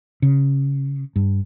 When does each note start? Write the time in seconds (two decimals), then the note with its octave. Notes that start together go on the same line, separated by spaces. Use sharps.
0.22 C#3
1.16 G2